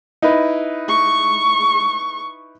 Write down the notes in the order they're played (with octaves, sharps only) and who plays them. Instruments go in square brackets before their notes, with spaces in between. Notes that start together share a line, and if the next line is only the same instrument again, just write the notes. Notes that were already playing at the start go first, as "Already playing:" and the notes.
[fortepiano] D#4 E4 B4
[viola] C#6